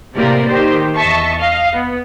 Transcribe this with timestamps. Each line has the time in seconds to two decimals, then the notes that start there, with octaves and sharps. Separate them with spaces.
0.15 A2 C3 A#3 G4 A#4 D5
0.47 D#3 G4 C5
0.95 E2 D#5 E5 A5 C#6
1.37 D#5 F5
1.73 B3